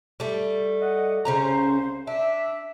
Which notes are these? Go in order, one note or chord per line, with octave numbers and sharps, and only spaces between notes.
G3 A3
D#5 F#5
C2 C#3 C#4 C5 A#5
D4 E5